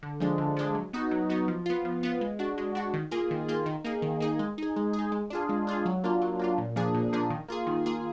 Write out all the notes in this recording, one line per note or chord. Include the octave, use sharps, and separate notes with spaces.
D3
F3 G#3 D4
D3
F3 G#3 D4
F#3
B3 D#4 F#4
F#3
B3 D#4 F#4
F3
B3 F4
F3
B3 F4
G#3
D4 F#4
G#3
D4 F#4
D#3
A#3 F4 G#4
D#3
A#3 F4 G#4
D#3
A#3 D#4 G#4
D#3
A#3 D#4 G#4
G#3
D#4 G#4
G#3
G#4
D#4
G#3
D4 F4 G#4
G#3
D4 F4 G#4
F#3
A#3 D4 F4
F#3
A#3 D4 F4
A#2
F3 A#3 D4 G#4
A#2
F3 A#3 D4 G#4
D#3
A#3 F4 G#4
D#3
A#3 F4 G#4